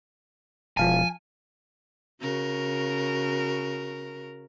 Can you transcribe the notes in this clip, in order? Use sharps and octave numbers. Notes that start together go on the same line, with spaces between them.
E1 F3 F5 G#5 A5
C#3 F#4 A#4